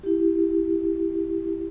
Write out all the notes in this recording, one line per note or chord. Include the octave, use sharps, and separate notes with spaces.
E4 G4